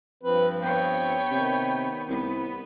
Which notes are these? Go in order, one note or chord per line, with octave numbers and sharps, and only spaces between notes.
G2 F3 C4 B4
B3 C#5 G5
C3 D#3
C2 B3